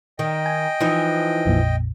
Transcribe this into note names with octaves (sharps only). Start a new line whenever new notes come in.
D#3 D#5 G5
G#5
E3 F3 D#4
A#1 F2 A#2